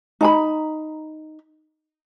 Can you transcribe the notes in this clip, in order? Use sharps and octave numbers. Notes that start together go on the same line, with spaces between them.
D#4 A#5 B5